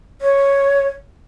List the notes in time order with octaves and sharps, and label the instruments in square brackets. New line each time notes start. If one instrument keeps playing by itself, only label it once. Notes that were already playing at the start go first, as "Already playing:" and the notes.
[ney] C#5